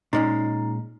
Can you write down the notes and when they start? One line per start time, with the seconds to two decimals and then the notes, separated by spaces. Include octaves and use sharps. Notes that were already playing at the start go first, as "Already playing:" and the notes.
0.13 A#2 G#3 C#4 D#4